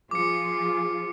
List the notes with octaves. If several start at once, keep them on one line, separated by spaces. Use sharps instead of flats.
F3 F4 G#4 D6 C#7